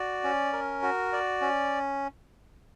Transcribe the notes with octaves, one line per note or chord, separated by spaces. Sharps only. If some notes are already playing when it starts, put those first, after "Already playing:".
Already playing: F#4 D5
C#4
A#4
F#4
D5
C#4